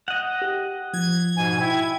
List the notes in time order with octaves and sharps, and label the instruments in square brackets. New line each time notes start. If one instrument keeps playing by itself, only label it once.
[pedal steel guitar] D#5 F#5
[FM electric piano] G4
[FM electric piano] F3 [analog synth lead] G#6
[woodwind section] G#2 B2 G#5
[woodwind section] E4 [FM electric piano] G5